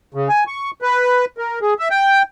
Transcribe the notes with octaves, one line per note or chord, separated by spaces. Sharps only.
C#3
G#5
C#6
B4
A#4
G#4
E5
G5